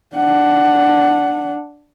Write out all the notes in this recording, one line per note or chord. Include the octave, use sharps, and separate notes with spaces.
D4 F#5